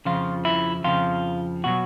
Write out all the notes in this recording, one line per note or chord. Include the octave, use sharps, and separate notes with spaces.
F2 C#3 F3 F4
E4
F2 C#3 F3 F4
B2 F#3 F#4